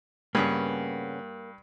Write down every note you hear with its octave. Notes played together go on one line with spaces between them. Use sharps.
G2 C#3 A#3 B3 C#4